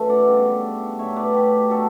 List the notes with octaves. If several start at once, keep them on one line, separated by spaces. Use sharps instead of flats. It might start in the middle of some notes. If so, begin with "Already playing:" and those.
Already playing: F#2 E3 A3 A4 B4
D5 F#5
C#3 G3 B3 D4
A2 F#3 A3 C#5 E5
B4 D5
G4 B4
B2 F#3 B3 D4 F#4 A4